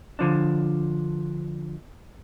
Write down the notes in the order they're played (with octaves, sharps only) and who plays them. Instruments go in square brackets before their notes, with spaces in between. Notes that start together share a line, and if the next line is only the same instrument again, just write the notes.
[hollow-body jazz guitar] D3 F3 D4